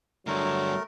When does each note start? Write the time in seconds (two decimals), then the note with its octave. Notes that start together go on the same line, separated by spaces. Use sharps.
0.27 G2 D3 F#3 A3 A#4